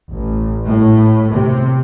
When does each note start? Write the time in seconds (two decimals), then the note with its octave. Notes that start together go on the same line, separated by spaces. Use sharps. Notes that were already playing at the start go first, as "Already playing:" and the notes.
0.11 A1
0.66 A2
1.32 C3